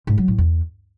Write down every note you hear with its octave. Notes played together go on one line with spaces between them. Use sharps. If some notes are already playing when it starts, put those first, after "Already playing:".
G#2
F#3
A2
E2